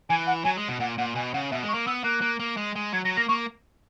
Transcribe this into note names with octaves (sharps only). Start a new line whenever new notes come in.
E3 G#5
F#5
F#3 G#5
G#3
B2
A#2 F#5
A#2 F#5
B2 G#5
C#3 F#5
B2 E5
G#3
C#6
A#3
B3 E6
A#3 F#6
A#3
A#3
G#3
G#3
F#3 G#6
F#3 A#6
A#3 A#6
A#3 C#6